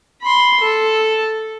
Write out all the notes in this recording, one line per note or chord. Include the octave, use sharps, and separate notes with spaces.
B5 C6
A4